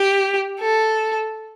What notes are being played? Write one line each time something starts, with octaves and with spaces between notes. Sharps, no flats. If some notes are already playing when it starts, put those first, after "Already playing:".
Already playing: G4
A4